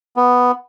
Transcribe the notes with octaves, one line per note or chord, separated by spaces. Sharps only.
B3